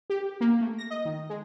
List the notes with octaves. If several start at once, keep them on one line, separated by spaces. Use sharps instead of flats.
G4
A#3
A3
A#6
D#5
D#3
G#3